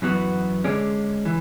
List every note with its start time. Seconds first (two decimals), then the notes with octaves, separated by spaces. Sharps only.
0.02 F#2 E3 B3 F#4
0.64 D3 G#3 C#4 G#4 D5
1.25 E3